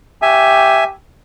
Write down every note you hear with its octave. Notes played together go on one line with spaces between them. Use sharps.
G4 E5 G#5